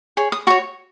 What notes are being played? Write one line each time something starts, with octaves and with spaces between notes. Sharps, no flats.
G#4 C#5
D#6
F#4 C#5 C#6